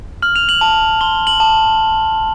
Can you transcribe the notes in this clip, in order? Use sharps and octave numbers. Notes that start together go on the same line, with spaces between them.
F6 F#7
F7
F#7
A5
C6 G7
F#7
A5